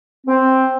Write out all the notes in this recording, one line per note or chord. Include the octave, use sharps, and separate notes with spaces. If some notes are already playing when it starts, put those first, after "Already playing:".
C4